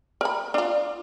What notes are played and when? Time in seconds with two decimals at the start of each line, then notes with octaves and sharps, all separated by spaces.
0.21 A#4 B5
0.54 D4 F4